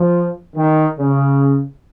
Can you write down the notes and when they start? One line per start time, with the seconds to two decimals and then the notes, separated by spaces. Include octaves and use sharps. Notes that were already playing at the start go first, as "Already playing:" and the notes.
Already playing: F3
0.56 D#3
0.99 C#3